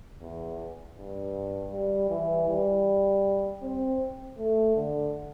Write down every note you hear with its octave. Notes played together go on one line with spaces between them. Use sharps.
E2
G2
G3
E3
G3
C4
A3
D3